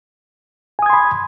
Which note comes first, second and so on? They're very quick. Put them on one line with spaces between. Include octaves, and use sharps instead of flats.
G#5 D#6 G#6 C6 B5